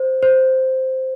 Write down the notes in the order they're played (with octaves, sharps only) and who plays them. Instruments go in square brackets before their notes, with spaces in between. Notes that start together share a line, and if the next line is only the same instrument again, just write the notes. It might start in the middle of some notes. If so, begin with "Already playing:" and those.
Already playing: [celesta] C5
C5